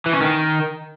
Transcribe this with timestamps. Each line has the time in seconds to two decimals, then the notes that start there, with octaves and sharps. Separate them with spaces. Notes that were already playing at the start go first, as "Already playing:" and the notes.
0.06 E3
0.13 C#4
0.21 D#3